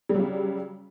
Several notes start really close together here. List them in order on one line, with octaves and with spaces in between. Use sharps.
G3 F#3 C#3